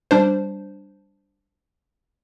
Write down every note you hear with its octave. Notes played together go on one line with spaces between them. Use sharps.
G3 D4 C5